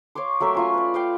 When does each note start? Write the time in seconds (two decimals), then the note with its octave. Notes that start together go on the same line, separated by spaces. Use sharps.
0.15 C#5 F5 C6 D6
0.40 F#3 A3 A#4 E5
0.55 C#4 F4 C#6
0.74 B4 D5
0.94 D5 F5 G5